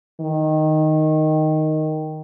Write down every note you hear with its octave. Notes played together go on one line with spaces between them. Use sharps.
D#3